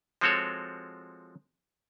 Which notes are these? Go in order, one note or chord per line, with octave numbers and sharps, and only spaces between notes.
F3 G#3 C4 F#4 A4 C#5